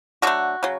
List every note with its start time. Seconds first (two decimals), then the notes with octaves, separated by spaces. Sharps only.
0.22 D3 F#3 A3 D4 F#4
0.63 C#3 F#3